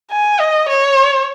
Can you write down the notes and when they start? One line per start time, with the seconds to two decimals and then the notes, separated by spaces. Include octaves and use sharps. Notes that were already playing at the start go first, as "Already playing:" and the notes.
0.10 G#5
0.39 D#5
0.69 C#5